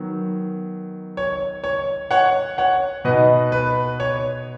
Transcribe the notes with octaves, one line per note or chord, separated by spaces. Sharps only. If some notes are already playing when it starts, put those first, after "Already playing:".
Already playing: D#3 F#3 B3
C#5
C#5
C#5 F#5
C#5 F#5
B2 B3 D#4 B4 D#5
B4
C#5